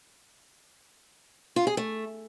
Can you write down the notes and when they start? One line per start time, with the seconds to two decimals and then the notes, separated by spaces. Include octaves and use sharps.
1.56 F4
1.67 G#4
1.77 A3